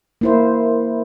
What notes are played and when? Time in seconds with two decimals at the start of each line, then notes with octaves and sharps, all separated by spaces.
0.21 A#3 E4 C5